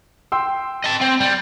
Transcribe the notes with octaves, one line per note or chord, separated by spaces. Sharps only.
G5 C6 E6
D#5 A5
C4
G3